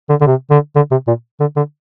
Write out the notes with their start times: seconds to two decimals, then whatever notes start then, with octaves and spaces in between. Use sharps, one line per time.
0.09 D3
0.21 D3
0.27 C3
0.50 D3
0.76 D3
0.91 C3
1.07 A#2
1.40 D3
1.56 D3